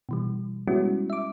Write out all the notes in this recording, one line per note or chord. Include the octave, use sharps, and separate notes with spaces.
B2 E3 G3
G3 G#3 B3 C#4 E4 F#4
E5 D6